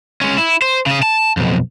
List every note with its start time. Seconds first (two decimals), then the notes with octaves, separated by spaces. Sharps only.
0.21 G#3 C#4
0.38 E4
0.62 C5
0.86 C#3 G#4
1.03 A5
1.37 B1 F2